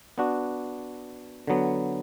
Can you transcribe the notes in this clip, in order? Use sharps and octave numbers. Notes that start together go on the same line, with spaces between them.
B3 D4 F#4
D3 F#3 B3